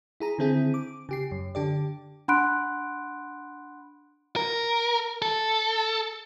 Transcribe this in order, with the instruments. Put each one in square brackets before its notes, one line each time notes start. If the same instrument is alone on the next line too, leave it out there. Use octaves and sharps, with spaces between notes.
[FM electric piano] E4 G#4 A#5
D3 D#3 C4 E4 G#4
D6
C#3 G4 C7
F#2
D3 G4 D5
[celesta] D4 F#5 B5 C6 F#6 D7
[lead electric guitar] A#4
A4